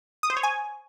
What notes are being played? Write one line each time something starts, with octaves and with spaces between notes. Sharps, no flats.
D#6
C5
C#5
G#5